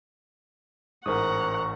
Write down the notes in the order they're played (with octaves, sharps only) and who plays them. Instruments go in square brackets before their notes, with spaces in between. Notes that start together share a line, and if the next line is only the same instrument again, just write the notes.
[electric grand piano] A1 G#2 [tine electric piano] A#4 C5 D#6 [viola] F#5 A#5 [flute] C#6